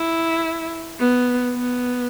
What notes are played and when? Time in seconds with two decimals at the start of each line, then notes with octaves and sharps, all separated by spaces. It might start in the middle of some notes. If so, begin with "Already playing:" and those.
Already playing: E4
1.00 B3
1.54 B3